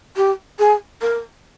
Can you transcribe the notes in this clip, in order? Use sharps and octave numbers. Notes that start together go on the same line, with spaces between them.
G4
G#4
A#4